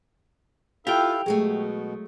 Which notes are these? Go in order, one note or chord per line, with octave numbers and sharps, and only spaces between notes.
E4 F4 G4 A4 F5 G5
B2 F#3 G#3 A3 G#4